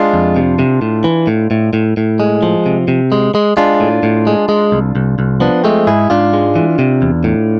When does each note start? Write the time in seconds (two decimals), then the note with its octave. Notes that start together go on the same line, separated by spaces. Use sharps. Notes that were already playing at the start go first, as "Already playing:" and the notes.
Already playing: G#3 D4 F4
0.13 F2
0.36 C3
0.59 C3
0.82 A2
1.04 E3
1.27 A2
1.51 A2
1.73 A2
1.97 A2
2.20 G#3
2.42 F3
2.66 C3
2.88 C3
3.12 G#3
3.35 G#3
3.57 G#3 D4 F4
3.80 A2
4.03 A2
4.27 G#3
4.49 G#3
4.72 C2
4.95 C2
5.19 C2
5.40 F3 B3 D4
5.64 G#3 A3 C4
5.87 G#2 E4 G#4
6.10 G#2 D4 F4
6.33 G#3
6.55 E3
6.79 C3
7.02 E2
7.24 A2